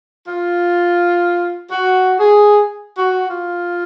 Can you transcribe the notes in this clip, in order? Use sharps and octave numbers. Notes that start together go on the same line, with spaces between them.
F4
F#4
G#4
F#4
F4